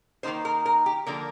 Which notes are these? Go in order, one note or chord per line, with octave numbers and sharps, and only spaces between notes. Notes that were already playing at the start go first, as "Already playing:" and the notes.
D#3 A#3 D#4 C5
A#4
A#4
G4
D3 F3 A#3 A#4